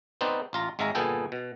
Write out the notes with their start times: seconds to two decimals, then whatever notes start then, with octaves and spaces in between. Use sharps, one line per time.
0.21 B3 C4 D#4 B4 C5 D5
0.53 A1 F4 A#5
0.79 G#1 G#3 E5 F5 A#5
0.95 G1 A#2 B3 G#4 A4 G5
1.32 B2